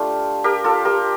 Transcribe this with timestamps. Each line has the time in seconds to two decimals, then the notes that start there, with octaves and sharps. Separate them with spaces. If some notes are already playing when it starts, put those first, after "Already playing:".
Already playing: A3 D4 F4 G4
0.44 G4 A#4
0.64 F4 A4
0.85 G4 A#4